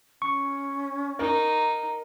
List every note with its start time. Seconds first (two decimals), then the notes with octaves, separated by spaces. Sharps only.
0.22 C#4 C#6
1.19 D#4 A#4